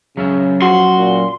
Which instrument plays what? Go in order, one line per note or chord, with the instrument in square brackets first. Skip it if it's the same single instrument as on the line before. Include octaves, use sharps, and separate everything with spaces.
[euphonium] C#3 [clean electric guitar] F#3 C#4 E5
[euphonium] F3 [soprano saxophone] F#4 [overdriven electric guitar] C6
[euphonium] A#2